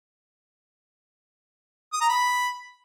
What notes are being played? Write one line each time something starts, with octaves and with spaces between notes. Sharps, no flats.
D#6
A#5
B5